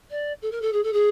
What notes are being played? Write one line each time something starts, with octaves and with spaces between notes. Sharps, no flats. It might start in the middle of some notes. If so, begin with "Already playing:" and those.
D5
A4
A#4
A4
G#4
A4
G#4